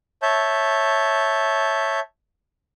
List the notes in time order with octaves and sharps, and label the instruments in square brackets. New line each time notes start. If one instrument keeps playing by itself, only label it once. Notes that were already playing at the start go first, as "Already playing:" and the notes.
[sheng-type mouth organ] C#5 E5 A5 G6